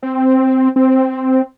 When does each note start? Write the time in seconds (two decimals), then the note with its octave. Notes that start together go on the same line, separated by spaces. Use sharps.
0.03 C4
0.76 C4